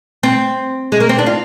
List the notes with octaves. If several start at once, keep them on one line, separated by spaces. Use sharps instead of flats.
C4
G#3
A#3
C4
D4
F4